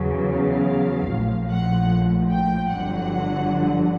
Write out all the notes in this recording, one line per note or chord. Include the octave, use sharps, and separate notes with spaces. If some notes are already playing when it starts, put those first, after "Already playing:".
Already playing: E2 C#3 F#3
F5
A#1 A2 F3
F#5
G5
G1 F2 D3 F#3 F#5